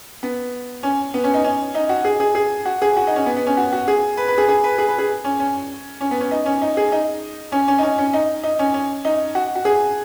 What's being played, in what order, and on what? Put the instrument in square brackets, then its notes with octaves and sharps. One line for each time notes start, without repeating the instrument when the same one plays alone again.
[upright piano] B3
C#4
B3
C#4
D#4
C#4
D#4
F#4
G#4
G#4
G#4
F#4
G#4
F#4
D#4
C#4
B3
B3
C#4
F#4
F#4
G#4
B4
B4
G#4
G#4
B4
G#4
B4
G#4
C#4
C#4
C#4
B3
C#4
D#4
C#4
D#4
G#4
D#4
C#4
C#4
D#4
C#4
C#4
D#4
D#4
C#4
C#4
D#4
F#4
F#4
G#4